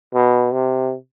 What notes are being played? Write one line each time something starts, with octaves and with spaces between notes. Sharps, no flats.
B2
C3